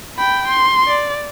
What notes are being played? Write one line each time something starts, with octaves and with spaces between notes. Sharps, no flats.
G5 B5
C6
D5